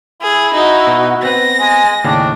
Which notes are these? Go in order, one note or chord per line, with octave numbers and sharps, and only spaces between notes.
E4 G#4
D#4 F#4
B2
B3 C4 B4 A#6
G#3 G#5
D#2 A2 C#3 D4 G5